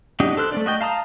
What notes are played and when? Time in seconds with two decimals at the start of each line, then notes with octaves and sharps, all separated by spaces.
0.20 D4 D#4 F#4 G4 D#5
0.37 A4 C5 F6 F#6
0.52 A3 D4 D5
0.66 F#4 D#5 G5
0.81 F5 A5 A#5 D#6